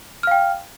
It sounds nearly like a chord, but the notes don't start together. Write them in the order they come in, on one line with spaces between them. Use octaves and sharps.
F6 F5 G5